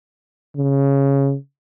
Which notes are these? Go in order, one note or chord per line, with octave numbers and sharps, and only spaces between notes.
C#3